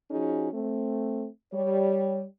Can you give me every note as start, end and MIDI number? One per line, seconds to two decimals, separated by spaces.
0.11 0.48 53
0.11 0.48 61
0.11 0.48 63
0.11 0.48 66
0.11 0.48 68
0.52 1.27 57
0.52 1.27 60
1.54 2.23 55
1.54 2.23 73